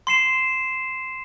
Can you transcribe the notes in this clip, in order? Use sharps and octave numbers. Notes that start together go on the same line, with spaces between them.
C6 C7 E7